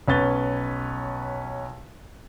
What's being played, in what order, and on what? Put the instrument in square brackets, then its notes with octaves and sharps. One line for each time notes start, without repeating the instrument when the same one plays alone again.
[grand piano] B1 C#4 B4 A6 G7